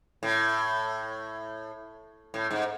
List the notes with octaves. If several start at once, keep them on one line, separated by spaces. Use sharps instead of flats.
A2
A2
G#2